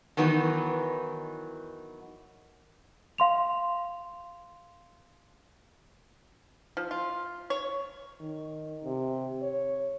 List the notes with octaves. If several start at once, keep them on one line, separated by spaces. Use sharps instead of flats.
D#3 E3 F#3 B3 D#4
F5 C6 F7
F3
F4
C#5
D#3
C3
C#5